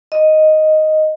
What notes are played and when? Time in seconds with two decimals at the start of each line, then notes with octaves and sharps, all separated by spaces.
0.12 D#5